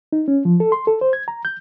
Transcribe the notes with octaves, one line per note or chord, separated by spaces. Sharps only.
D#4
C#4
F3
A4
C6
A4
C5
G#6
A#5
G6